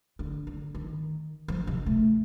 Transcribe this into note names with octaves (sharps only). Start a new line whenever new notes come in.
D3
D3
D#3
F3
C3
A3